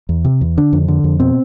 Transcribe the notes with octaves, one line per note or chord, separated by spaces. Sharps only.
E2
C3
E2
D3 D4
F2
D3
F2
B2 C4